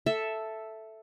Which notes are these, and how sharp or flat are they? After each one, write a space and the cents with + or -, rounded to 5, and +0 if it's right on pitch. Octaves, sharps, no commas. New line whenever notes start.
A4 +0 E5 +0